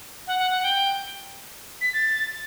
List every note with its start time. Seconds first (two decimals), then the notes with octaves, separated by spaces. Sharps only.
0.27 F#5
0.39 F#5
0.51 F#5
0.63 G5
1.81 B6
1.93 A6